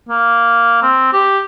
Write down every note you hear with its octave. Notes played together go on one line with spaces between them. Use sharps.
A#3
C4
G4